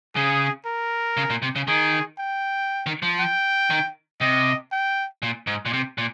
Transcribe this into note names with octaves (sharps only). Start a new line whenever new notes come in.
C#3 G#4
A#4
C#3
A#2
C3
C#3
D#3 G#4
G5
D#3
F3
G5
D#3
C3 D#5
G5
A#2
G#2
A#2
C3
A#2